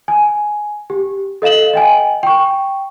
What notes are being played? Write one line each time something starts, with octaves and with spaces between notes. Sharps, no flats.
G#5
G4
A4 D#5 F5 E7 F#7
D#5 G5 G#5
G5 C#6